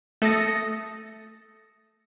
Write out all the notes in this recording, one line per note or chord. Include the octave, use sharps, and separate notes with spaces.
A3 A4 D#6 A6 A#6 C#7